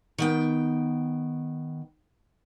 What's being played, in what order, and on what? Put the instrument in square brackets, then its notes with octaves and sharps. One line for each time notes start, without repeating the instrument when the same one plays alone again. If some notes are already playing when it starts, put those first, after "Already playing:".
[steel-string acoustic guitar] D#3 B3 G5